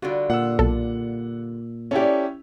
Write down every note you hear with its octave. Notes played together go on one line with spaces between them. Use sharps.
D3 G3 F4 F#4
A#2 F#5 E6
B1 A4
C#4 E4 G4 A4 D5